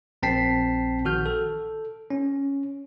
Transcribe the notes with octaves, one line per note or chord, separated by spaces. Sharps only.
A#1 C4 G5 A5 B6 C7
A#1 D#3 F#4 F6 G6
A4
C#4